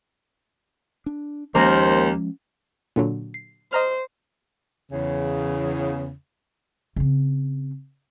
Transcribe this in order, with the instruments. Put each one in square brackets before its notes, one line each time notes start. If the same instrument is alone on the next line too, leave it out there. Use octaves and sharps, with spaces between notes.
[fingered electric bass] D4
[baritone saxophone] D#2 [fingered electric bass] F3 G#3 C#4 [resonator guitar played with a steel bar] A#3 A#4 [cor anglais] C5
[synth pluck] A#2 D3 F#3
C7
[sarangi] C5 [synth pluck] D#5 A#5 F6
[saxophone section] E2 C#3
[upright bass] C#3 C4